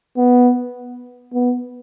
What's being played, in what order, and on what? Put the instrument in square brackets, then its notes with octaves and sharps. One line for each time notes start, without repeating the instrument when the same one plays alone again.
[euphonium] B3
B3